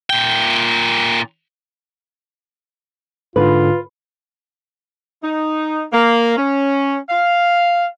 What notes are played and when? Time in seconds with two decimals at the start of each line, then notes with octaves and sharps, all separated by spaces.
0.10 A#2 G5
3.36 G#2 D3 F4 B4
5.24 D#4
5.93 A#3
6.37 C#4
7.10 F5